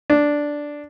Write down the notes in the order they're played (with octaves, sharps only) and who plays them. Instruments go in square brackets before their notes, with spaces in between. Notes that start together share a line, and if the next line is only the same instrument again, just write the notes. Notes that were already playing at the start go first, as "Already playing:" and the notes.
[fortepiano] D4